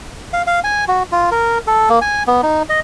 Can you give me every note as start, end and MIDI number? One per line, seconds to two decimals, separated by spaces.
0.33 0.42 77
0.47 0.60 77
0.64 0.85 80
0.88 1.03 66
1.12 1.30 65
1.31 1.58 70
1.67 1.89 69
1.90 1.99 58
2.01 2.23 80
2.27 2.41 59
2.43 2.63 63
2.69 2.80 75